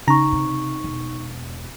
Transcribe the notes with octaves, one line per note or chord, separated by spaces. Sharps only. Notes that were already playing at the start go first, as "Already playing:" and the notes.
C#3 D#4 A#5 C#6
C3
E1